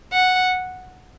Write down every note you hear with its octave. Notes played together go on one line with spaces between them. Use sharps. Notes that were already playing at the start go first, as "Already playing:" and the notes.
F#5